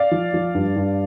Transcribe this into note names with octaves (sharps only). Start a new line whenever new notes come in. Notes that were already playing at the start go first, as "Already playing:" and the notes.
Already playing: D5 F5
F3
F3
G2
G2